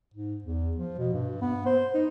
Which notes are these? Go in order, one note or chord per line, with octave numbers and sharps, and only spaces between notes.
G#2
E2
F3
B2
G2
B3
C5
D#4